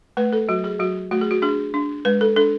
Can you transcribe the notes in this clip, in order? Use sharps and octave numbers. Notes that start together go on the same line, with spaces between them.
A3 B4
A4
F#3 F#4
G#4
F#3 F#4
A3 F#4
G#4
F#4
D4 G#4
D4
G#3 B4
A4
D4 A4